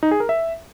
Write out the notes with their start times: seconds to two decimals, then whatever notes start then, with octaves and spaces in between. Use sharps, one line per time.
0.03 D#4
0.11 G#4
0.20 A#4
0.29 E5